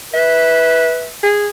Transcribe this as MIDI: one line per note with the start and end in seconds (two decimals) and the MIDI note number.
0.14 1.09 71
0.14 1.12 76
1.23 1.48 68